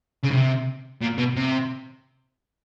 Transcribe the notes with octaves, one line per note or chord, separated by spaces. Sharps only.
C#3
C3
A#2
B2
C3